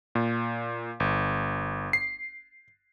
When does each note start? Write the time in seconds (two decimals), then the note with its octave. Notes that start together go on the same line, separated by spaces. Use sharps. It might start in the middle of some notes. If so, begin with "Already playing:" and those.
0.15 A#2
1.00 G1
1.93 C7